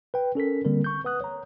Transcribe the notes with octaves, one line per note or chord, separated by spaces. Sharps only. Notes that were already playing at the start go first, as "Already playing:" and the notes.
B4 G5
C#4 A4 A#4 B6
D3 G3 A#3 C4 A#4
C#6 G6
B4 F#5 D#6 F#6
C#5 A#5